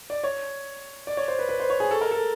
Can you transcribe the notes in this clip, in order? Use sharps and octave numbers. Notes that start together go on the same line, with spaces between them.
D5
C#5
D5
C#5
C5
B4
B4
C5
C#5
G#4
A4
A#4
A4